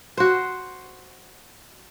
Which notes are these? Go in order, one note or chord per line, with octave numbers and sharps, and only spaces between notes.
F#4 C5